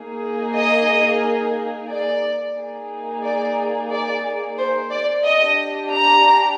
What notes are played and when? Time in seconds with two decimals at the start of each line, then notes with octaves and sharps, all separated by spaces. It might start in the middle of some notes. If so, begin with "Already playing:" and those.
Already playing: A#3 D#4 G#4
0.55 D#5
1.89 D5
2.56 A#3 D#4 G#4
3.23 D5
3.90 D5
4.58 C5
4.90 D5
5.24 D4 G4 D#5
5.91 A#5